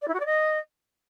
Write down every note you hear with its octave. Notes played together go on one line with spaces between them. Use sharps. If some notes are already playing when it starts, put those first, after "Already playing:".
D5
E4
F#4
D5
D#5